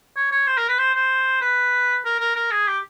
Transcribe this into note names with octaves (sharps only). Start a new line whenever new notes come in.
C#5
C#5
C5
A#4
B4
C5
C5
B4
A#4
A#4
A#4
G#4
G4